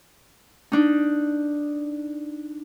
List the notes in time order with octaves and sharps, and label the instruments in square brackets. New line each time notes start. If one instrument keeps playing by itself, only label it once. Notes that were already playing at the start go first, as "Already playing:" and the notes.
[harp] D4 D#4